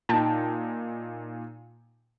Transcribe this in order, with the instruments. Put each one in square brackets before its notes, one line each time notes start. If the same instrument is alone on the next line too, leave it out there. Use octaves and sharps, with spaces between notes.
[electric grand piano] A#2 D#4 [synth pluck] G5 A5